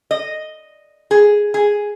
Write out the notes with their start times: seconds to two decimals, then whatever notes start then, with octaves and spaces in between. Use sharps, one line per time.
0.11 D#5
1.11 G#4
1.54 G#4